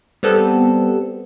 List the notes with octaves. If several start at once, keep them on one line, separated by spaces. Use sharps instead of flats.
G3 B3 C4 A4